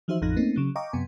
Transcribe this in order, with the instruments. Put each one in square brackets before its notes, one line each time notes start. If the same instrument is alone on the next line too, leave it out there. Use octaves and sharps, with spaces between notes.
[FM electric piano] E3 F3 D#4 F#4 C5 E5
A1 F2 F3 D#4 F#6 A#6
A3 A#3 C4 C#4 D#4
C#3 F#3
D#5 F5 G5 A#5 C#6 D6
F#2 C3 B3 G#5